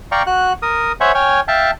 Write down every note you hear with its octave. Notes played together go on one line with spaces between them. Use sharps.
D5 F5 G5 A#5 C#6
F#4 F#6
A#4 D#6
C5 C#5 E5 F#5 G#5
C#5 G5 G#5 F6
E5 F5 G5 A5